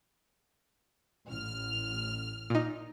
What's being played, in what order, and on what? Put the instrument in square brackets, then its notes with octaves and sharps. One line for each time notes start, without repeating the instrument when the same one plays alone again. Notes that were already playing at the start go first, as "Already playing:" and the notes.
[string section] A1 F6
[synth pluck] A#2 D#4